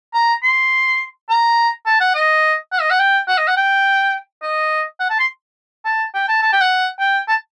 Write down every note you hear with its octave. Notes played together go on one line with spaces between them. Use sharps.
A#5
C6
A#5
A5
F#5
D#5
F#5
D#5
F#5
G5
F#5
D#5
F#5
G5
D#5
F#5
A5
C6
A5
G5
A5
A5
G5
F#5
G5
A5